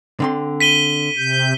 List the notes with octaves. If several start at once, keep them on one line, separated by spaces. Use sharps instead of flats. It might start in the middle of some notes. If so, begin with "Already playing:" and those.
D3 C4 C6
B6 D#7 G7
C3 G6